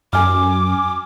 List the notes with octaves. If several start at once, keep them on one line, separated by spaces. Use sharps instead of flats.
F#2 G#5 D6 F6